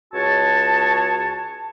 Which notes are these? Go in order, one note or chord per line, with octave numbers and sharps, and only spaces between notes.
C#2 F#4 G#4 C#5 A5